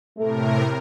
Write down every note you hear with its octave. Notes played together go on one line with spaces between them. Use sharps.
A2 C3 A3 A#4